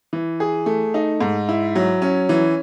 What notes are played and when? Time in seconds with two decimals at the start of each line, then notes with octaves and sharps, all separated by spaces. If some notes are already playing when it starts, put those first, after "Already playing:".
0.13 E3
0.40 G#4
0.66 A3
0.94 D#4
1.21 G#2
1.49 E4
1.75 F#3
2.02 C#4
2.29 E3